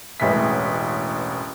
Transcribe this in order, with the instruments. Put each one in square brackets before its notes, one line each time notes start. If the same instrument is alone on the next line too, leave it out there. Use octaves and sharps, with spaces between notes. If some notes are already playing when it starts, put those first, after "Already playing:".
[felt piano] E1 A1 E3 B6